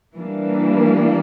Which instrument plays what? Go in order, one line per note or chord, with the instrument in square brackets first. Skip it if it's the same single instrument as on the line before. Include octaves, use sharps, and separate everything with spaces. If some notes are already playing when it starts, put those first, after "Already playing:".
[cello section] E3 G3 A#3 D4